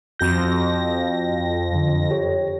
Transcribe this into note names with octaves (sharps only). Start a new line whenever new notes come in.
F2 C4 F#4 G6 A#6
F#2 D3
G4 C#5